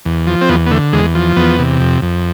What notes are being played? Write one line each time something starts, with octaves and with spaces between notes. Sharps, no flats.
E2
F3
C4
E2 B3
B3
D3 A3
E2 G#3
F3
E2 B3
C3
F2
F2